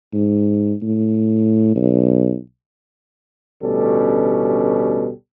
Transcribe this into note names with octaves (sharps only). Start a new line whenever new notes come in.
G#2
A2
B1
A1 D2 B2 G3 C#4 A4